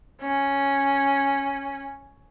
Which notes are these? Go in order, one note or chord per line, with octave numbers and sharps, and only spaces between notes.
C#4